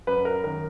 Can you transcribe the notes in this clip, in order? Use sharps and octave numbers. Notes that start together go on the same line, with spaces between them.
F#2 B4
A#4
D#3 A#4